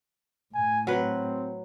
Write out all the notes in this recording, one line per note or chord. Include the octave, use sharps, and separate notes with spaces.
A2 G#5
F#3 C4 B4